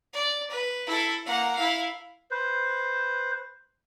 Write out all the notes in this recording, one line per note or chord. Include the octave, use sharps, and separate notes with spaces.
D5
B4
E4 A4
A#3 F#5
E4 F5
B4 C5